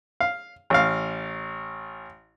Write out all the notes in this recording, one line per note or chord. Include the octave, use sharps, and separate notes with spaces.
F5
A1 F5